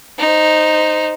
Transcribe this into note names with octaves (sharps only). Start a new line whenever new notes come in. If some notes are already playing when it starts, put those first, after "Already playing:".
D#4 C5